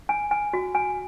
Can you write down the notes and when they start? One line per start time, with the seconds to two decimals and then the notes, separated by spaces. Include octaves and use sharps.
0.09 G#5
0.31 G#5
0.53 F#4
0.75 G#5